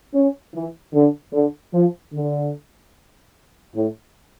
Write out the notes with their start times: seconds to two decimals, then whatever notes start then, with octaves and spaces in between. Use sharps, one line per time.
0.13 C#4
0.53 E3
0.93 D3
1.32 D3
1.72 F3
2.13 D3
3.74 A2